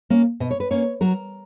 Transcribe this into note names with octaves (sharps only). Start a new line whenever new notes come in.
A#3 C#4
B2 D#5
C#5
B4
A#3 C#4 C#5
F#3 A#4